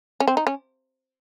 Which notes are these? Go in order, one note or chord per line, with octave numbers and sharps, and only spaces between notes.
C#4
C4
D#4
C#4